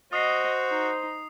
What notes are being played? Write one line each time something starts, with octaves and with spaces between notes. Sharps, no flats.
F#4 C5 D#5 D#6 C7
D#4